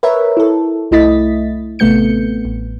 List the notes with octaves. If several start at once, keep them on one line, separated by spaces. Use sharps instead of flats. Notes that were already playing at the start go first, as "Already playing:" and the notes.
A#4 B4 C#5 E5
E4 A4
C2 A3 E4 D#5 A6 B6
A1 C3 A3 B3 G6 C#7
A1